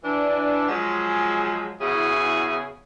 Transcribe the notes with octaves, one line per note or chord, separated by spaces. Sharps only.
E3 D4
F3 F#3 G#3
E2 C#3 E4 F#4 G#4